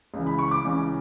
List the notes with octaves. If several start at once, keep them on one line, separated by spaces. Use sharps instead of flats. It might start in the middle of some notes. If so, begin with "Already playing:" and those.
C#2 C#3 E3
B5
C#6
D6
C#2 C#3 E3